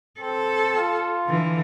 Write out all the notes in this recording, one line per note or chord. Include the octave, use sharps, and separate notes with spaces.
C4 A4
F4
D3 E3